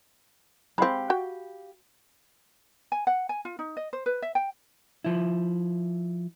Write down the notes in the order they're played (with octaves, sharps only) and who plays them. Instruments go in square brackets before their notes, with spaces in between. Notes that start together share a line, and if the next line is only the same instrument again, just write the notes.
[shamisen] G#3 C4 [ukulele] G4 F5 B5
[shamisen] F#4 G5
[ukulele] G#5
F#5
G#5
F4
D#4
D#5
C5
B4
E5
G5
[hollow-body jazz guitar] F3 E4